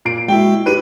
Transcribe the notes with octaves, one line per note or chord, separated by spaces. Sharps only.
A#2 C7 D7
G#3 E4 F#4 G5
D#4 F#4 G4 B4 D#7